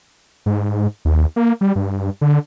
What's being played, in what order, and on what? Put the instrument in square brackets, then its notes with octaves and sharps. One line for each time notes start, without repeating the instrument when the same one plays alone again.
[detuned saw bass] G#2
D#2
A#3
G3
G2
D3